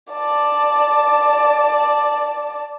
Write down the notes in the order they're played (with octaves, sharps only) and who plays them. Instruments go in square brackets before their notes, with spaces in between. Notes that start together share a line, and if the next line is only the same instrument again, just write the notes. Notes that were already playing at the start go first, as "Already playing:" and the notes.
[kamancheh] D5 A5